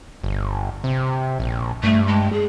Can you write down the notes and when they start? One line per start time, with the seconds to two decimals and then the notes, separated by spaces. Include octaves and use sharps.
0.24 G1
0.84 C3
1.40 A#1
1.83 G2 A3
2.08 G#3
2.33 G#4